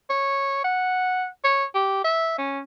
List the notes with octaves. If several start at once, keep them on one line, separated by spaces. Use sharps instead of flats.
C#5
F#5
C#5
G4
E5
C#4